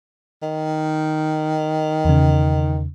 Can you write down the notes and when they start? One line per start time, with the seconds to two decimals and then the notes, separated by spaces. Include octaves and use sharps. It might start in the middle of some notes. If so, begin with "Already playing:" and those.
0.43 D#3
2.05 E2 C#3